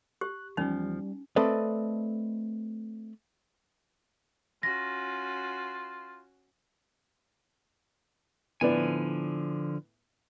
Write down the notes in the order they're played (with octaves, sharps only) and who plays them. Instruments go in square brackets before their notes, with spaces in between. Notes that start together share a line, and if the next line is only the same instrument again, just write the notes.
[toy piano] G4 [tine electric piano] F#6
[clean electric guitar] E2 F3 [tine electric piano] G3 [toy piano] C#4 D#4
[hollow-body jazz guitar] A3 C4 A4 B4 D5 D#5
[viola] C#4 F#4 [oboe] F4 [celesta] A#6
[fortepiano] A2 B3 D5 [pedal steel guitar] D3 F3 G#5